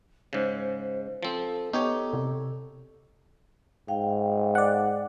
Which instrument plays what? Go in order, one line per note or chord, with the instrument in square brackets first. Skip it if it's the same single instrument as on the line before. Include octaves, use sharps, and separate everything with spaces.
[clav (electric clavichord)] G#2 C#3 [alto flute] C5
[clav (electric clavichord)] F3 C4 [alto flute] A4
[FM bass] B3 [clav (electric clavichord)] D#4 G4 C#5 [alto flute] A4
[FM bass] C3
[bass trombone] G#2 [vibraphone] F5 G5
[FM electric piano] D5 F#5